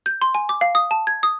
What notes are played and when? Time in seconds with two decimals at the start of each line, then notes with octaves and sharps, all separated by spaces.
0.06 G6
0.22 C6
0.35 G#5
0.49 D6
0.61 F5
0.75 D#6
0.91 A5
1.07 G#6
1.23 D#6